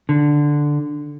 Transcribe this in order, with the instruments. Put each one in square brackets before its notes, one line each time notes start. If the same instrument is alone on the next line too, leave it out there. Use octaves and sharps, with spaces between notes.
[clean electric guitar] D3